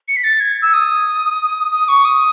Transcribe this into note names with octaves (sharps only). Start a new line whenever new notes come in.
C#7
B6
A6
G#6
E6
D#6
D#6
C#6
D#6